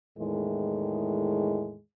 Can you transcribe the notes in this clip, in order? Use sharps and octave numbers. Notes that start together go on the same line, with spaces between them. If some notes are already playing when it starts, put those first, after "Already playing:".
E2 A2 D#3 G#3